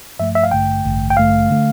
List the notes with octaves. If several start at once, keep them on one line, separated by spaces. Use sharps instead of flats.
G2 F3 A3 E5
E5
F5
A1 G2 D3 A3 G5
A1 G2 D3 A3
G5
A1 G2 D3 A3 F5
D3 A3